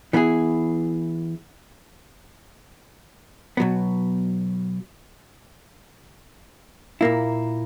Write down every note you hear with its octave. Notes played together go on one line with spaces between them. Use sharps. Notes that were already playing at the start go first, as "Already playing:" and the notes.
E3 B3 E4 G#4
B2 F#3 B3
A#2 A#3 E4